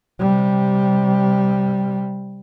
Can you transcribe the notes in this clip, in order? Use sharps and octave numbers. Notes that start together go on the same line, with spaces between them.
C3 G3